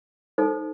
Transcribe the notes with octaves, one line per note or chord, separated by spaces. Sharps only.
D#4 A4 C5